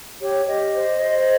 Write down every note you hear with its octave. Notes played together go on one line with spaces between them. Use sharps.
G4 C#5
G4 D#5
C5
C5